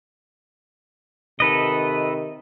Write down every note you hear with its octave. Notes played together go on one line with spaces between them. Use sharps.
C3 D#3 D#4 A4 B4 D#5